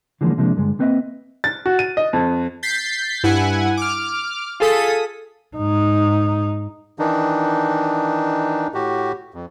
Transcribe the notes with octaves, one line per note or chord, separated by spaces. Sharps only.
D3 E3 F3 G#3 A#3 C#4
C3 F3 G#3 A#3 D4
G2 D3 G#3
A#3 C4 B4 C#5 D#5 E5
A6
F#4
D#7
D#5
F2
G6 A6 B6 C7
G2 E4 F#5 G#5
D6 F6
F4 G#4 A4 D#6 B6
G#2 D#4
D#3 E3 D4 D#4
A2 F#4 G4
F2